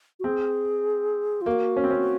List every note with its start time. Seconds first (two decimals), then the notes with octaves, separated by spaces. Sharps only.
0.20 F#4
0.24 C4 G#4
1.41 F4
1.46 A#3 F#4
1.77 C#4
1.84 C4
1.90 C#4